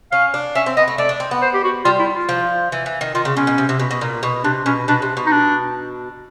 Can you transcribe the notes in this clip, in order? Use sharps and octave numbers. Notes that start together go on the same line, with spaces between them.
C#4 F5
D4
C#4 E5
C4
B3 D#5
A3
A3 D5
D4
C4
B3
C5
G4
F#4
G3 F4
E4
F4
F3
E3
E3
D#3
D#3 F4
C#3
B2 C#4
B2
C3
C3
B2
B2
A#2
B2
C3 D4
B2 C#4
B2 D4
C3
B2
D#4
D4